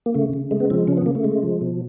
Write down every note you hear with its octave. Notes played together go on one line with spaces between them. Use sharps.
A#3
C#3 A3
C#3
G#3 A3
B3
F3 C4
C#3 C#4
B3
C#3 A#3
A3
G#3
F3
B2